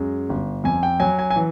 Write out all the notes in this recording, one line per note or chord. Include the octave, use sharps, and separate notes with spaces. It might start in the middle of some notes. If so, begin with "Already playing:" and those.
Already playing: F#2 G#3
G1
F2 G#5
G5
F#3 G#5
G#5
G#5
E3